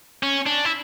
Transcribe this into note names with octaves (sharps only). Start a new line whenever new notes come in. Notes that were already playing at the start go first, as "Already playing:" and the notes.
C#4
D4
E4